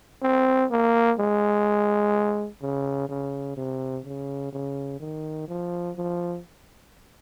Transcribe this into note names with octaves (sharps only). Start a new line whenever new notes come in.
C4
A#3
G#3
C#3
C#3
C3
C#3
C#3
D#3
F3
F3